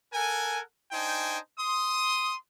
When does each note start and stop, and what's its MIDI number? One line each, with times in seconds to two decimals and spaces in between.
0.13 0.61 69
0.13 0.61 70
0.13 0.61 78
0.13 0.61 80
0.92 1.38 62
0.92 1.38 63
0.92 1.38 72
0.92 1.38 79
0.92 1.38 80
1.59 2.35 84
1.59 2.35 87